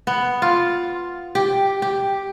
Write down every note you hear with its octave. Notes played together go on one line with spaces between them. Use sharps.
B3
F4
G4
G4